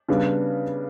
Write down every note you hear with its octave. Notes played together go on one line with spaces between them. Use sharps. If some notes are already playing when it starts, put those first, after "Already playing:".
C#3 G3 B3 D4